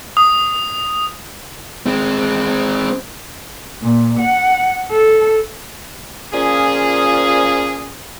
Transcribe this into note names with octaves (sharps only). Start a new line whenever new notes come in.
D#6
G#3 C4
A#2
F#5
A4
A#2 F3 C#4 G#4